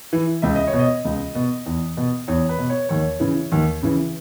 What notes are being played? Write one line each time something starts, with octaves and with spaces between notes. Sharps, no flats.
E3
C#2 E5
D#5
C#5
B2
D#5
C#2
B2
E2
B2
E2 C#5
B4
B2
C#5
D#2 C#5
C#3 E3
D#2
C#3 E3